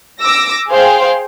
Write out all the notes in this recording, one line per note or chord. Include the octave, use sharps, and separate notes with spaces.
D6 E6 A#6
G#4 C5 F5 G5